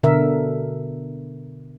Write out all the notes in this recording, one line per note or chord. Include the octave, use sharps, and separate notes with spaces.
B2 D3 A#4 E5